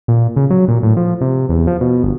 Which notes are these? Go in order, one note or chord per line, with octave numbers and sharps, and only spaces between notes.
A#2
C#3
F#3
A#2
A2
F3
C3
E2
F3
B2
G1